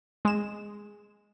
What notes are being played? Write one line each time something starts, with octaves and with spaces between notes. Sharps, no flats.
G#3 E7